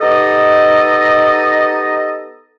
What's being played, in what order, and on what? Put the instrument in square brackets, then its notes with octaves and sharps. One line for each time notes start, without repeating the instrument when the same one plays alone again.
[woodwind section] B3 D#4 G4 A4 D#5